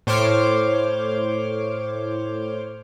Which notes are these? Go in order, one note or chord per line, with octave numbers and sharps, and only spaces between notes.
A2 C5 C#5 C6 D6 F6